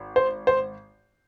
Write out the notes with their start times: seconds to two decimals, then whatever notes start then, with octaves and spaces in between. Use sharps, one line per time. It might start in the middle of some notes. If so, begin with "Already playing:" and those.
Already playing: G#1
0.16 C5
0.47 C5